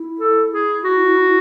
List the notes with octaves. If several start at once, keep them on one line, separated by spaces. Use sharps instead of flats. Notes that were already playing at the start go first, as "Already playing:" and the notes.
Already playing: E4
A4
G#4
F#4